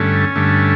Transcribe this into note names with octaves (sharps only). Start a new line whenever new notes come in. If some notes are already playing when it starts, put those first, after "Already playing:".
Already playing: G2 D3 A3 C#4
G2 D3 A3